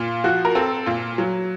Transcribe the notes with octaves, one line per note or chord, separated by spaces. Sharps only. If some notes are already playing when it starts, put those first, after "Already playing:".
Already playing: A#2 F4
F3 F#4
A#4
C4 A4
A#2 F4
F#3